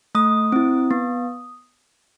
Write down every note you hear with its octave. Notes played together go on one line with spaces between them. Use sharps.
A3 D#6
C4 E4
B3